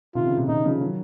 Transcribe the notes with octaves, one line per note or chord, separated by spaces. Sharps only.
C3 D#3 F4
C#3
C3
C3 D#3 D#4
C#3 F3
D#3 F#3